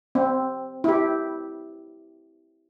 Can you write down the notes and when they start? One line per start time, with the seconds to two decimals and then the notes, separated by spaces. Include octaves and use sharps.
0.15 C4
0.84 E4 G4